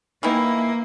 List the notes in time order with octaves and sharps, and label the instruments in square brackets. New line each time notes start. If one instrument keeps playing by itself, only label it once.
[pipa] D#3 E3 E4 [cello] A#3